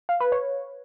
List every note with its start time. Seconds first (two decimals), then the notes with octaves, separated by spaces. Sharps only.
0.09 F5
0.20 B4
0.32 C#5